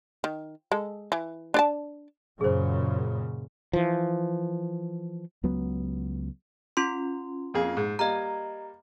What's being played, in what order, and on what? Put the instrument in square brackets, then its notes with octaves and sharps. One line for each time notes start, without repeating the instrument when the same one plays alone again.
[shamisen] D#3
G#3 A4
E3
D4 D5 A5
[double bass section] F#2 A#2 C#3 [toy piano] G#4 C5
[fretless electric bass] E3 F3
[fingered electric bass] C#2 F#3 B3
[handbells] C#4 F4 C6
[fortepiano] F2 A#3 G#4
G#2
[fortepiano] G3 A#3 [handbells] D#5 A#5